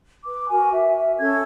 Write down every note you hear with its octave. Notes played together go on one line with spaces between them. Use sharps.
B4 D6
F#4 A#4 G#5
E5
E5
C#4 A4 G#6